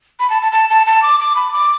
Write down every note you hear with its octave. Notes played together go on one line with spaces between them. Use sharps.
B5
A5
A5
A5
A5
A5
D6
D6
B5
D6